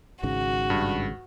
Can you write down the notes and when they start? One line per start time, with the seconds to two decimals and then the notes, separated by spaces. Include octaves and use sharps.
0.23 G#1 G#2 C#3 F#4
0.70 G2